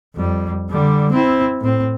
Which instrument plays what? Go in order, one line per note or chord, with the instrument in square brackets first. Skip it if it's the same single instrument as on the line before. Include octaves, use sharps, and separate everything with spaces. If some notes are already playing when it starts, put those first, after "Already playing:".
[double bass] F2 G3
D3 G3
C4 E4
A2 C4